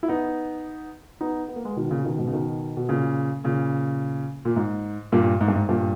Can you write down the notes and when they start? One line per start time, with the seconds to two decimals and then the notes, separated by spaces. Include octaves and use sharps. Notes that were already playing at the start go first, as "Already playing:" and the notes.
0.03 E4
0.08 B3 D#4
1.21 B3 D#4
1.48 B3
1.56 A#3
1.64 G#3 B3
1.76 B2 D#3
1.90 A#2 C#3
2.04 B2 D#3
2.18 G#2 B2
2.27 C#3
2.33 B2 D#3
2.77 B2
2.88 A#2 C#3
3.44 A#2 C#3
4.45 A#2
4.56 G#2
5.12 G2 A#2
5.41 G#2
5.48 G2
5.56 G#2
5.69 G2 A#2